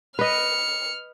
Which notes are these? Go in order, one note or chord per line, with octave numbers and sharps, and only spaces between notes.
B4 D#5 F6 C#7